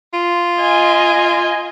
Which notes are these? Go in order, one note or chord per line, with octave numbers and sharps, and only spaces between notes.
F4
D#5 G#5